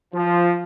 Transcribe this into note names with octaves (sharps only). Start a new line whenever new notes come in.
F3